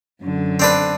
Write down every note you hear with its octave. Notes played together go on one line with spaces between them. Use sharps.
F#2 D3
C4 D4 B4